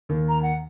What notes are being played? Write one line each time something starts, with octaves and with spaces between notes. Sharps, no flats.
D#2 D#3
A#5
F#5